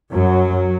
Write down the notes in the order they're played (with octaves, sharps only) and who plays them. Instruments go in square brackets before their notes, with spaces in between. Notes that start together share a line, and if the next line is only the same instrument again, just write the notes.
[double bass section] F#2 F#3